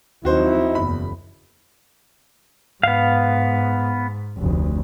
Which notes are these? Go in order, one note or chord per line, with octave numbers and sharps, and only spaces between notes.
D#2 F3 F#3 C4 D#4 E4 F#4 C5
F#1 E2 B5
G#2 B3 F5
F1 D2